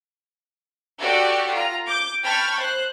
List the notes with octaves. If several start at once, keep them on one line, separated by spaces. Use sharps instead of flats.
F#4 G4 A4 D5 F#5 C#6
F4 A#5
D6 G6
G5 A5 B5 C#6 F6 G#6
C5 F#6